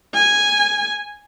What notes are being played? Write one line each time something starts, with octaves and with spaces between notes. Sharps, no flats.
G#5